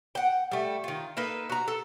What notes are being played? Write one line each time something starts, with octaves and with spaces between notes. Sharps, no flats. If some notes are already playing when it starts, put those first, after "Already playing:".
F#5 G5
G3 A3
D#3 F4
A#3 D#4 A4 B4
F#4 A#5
A4